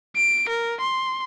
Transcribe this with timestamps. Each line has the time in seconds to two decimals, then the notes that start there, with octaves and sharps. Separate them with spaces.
0.16 D7
0.49 A#4
0.80 C6